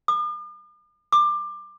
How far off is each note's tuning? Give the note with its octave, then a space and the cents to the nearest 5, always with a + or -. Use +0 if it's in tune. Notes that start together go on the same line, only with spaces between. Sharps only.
D6 +45
D6 +20